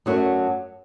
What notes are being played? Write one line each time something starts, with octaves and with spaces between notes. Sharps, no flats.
F#2 F#3 A3 D4 F#4